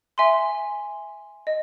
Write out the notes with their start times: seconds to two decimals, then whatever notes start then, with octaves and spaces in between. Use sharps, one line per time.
0.18 E5 G#5 C6
1.47 D#5